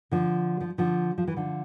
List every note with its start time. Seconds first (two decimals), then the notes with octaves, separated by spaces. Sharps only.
0.11 D3 F3
0.61 F3
0.78 D3 F3
1.18 F3
1.27 E3
1.36 D3 F3